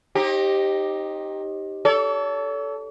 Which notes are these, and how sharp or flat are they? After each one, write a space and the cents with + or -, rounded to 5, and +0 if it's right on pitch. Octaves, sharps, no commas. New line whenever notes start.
C4 +40 D#4 +0 G4 +0
A4 +0 C#5 +45